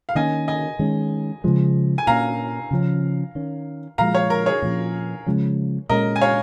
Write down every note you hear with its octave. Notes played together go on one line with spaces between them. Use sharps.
F5
D#3 A#3 C#4 D#5 G#5
D#5 G#5
D#3 G#3 C#4
C#3 F3 G#3
G#5
A#2 A#3 C#4 F5 A#5
C#3 F3 C#4
D#3 C#4
A#2 F3 G#3 F5 A#5
C#5 F5
A#4
G#4 C#5
A#2 F3 C#4
C#3 F3 G#3 C#4
A#2 G#3 C#4 A#4 D#5
G#5
C#5 F5